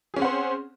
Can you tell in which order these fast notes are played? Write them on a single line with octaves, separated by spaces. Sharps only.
G#4 C#4 C4 F#5 C5